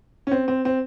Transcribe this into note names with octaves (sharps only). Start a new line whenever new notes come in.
C#4
C4
C4
C4